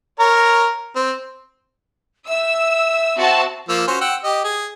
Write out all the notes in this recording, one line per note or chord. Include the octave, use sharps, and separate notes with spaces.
A#4 C#5 A#5
C4
E5 E6
C4 F#4 A5
F3 A#3 E6
C#4 F#4 C5
F#5 G5 E6
G4 D#5
G#4